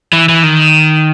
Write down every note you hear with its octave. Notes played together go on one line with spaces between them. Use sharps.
E3
E3
D#3